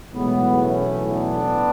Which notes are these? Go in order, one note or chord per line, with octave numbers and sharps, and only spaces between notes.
B1 A2 E3 G#3 B3
A3 C#4
B3 D4